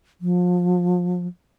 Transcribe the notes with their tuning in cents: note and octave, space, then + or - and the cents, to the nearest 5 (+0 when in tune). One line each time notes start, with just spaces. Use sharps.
F3 +30